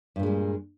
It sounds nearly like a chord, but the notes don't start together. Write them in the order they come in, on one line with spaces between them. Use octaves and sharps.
G2 A#2 G#3 G3